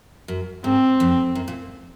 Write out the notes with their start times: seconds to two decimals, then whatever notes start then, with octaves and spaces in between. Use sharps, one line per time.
0.28 F#2
0.64 G#2 C4
1.00 F2
1.35 F#2
1.48 A#2